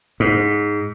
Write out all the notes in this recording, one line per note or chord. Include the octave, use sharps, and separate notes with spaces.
G#2